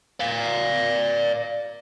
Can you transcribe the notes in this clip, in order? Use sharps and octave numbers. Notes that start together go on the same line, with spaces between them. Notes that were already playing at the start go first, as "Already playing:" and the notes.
D5 F5